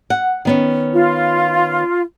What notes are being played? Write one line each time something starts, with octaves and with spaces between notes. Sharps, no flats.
F#5
D#3 B3 C#4
F4